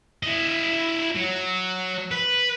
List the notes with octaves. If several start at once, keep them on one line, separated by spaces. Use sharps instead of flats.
E4 D#5
F#3
B4